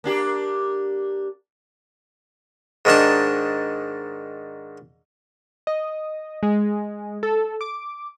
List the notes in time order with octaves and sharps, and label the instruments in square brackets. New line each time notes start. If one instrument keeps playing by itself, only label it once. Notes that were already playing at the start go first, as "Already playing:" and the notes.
[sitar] A#3 D4 G4
[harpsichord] G#2 D#3 D4 A5
[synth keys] D#5
G#3
A4
D6